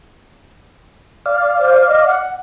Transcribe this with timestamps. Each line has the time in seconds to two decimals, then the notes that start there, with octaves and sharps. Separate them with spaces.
1.26 D5 F5
1.60 C5
1.88 D#5
2.06 F#5